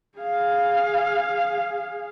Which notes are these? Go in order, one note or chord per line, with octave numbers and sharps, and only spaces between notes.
G#4 F5